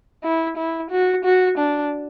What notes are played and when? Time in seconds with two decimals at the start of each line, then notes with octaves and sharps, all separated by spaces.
0.23 E4
0.57 E4
0.91 F#4
1.24 F#4
1.58 D4